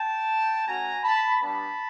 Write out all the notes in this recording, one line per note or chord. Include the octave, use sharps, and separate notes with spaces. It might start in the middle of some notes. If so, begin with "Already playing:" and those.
Already playing: G5 A5
A3 C#4 F#4 G#5 A#5
A5 B5
G3 B3 D4 A5 B5